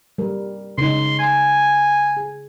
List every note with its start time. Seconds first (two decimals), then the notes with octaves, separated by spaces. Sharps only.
0.18 G3 A#4
0.78 C#3 D#4 C6
1.19 G#5
2.17 G#4